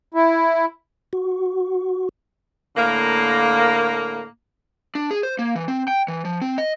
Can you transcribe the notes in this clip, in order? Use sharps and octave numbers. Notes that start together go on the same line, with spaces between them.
E4
F#4
A2 D3 A#3
D4
G#4
C5
A#3
E3
C4
G5
E3
F3
C4
D#5